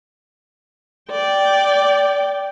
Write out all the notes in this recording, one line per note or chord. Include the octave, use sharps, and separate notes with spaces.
D5 G5